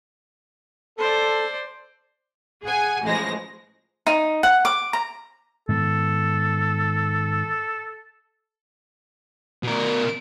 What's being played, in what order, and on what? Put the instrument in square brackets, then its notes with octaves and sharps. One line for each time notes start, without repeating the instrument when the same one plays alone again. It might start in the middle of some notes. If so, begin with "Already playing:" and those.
[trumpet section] A4 [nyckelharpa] C5 D5
[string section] G#4 F#5 G#5
A1 F3 G#3 A#6
[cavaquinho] D#4
F#5
D6
A#5
[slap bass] G#2 D#3 B3 [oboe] A4
[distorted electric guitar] B2 A#4